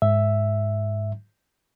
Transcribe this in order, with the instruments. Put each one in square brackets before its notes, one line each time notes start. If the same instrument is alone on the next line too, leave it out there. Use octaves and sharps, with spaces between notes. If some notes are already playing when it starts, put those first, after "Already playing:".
[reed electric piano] G#2 E5